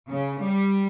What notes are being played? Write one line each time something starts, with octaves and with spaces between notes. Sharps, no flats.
C#3
G3